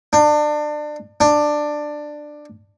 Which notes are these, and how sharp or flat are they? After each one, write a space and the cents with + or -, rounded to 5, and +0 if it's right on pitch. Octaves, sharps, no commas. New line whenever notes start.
D4 +30
D4 +15